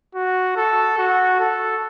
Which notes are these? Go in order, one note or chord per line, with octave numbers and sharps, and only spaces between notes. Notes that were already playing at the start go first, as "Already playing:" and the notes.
F#4
A4
F#4
A4